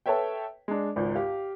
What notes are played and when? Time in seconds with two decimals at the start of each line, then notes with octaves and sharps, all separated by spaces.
0.06 A4 B4 C#5 E5 G5
0.68 G#3 D4
0.96 G#1 C#2
1.15 G4 F5